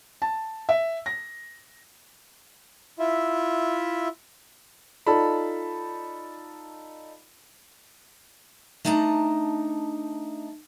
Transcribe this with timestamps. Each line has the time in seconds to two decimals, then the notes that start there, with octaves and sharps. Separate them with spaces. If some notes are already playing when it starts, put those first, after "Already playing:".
0.22 A5
0.69 E5
1.06 A#6
2.99 E4 F4 E5
5.07 D#4 F4 A4 D5 A5 B5
8.85 A3 D4 D#4 A5 A#5